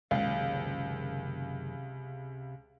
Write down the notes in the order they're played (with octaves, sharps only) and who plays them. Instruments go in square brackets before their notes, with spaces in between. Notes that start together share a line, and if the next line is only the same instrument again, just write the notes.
[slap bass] F#1 D#3 [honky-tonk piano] C#2 [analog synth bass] C3 [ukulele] F5